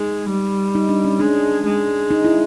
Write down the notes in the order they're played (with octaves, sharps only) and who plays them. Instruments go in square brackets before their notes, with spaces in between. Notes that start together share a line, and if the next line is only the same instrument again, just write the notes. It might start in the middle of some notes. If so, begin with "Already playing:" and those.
Already playing: [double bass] G#3 [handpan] D#4
[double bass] G3
[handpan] D#4
D4
C#4
[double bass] G#3 [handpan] D4
[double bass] G#3
[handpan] D#4
E4